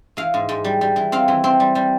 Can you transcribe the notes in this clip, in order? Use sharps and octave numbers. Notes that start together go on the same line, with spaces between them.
E3 F5
G#2
G#2
G3
G3
E3
C4 F5
E3
C4
G3
G3